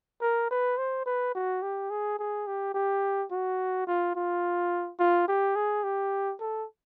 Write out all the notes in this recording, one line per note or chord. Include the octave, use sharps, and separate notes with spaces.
A#4
B4
C5
B4
F#4
G4
G#4
G#4
G4
G4
F#4
F4
F4
F4
G4
G#4
G4
A4